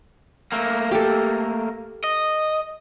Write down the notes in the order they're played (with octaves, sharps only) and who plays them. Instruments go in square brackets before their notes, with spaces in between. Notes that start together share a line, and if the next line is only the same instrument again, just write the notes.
[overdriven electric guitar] A3 A#3
[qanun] G4 A4
[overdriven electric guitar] D#5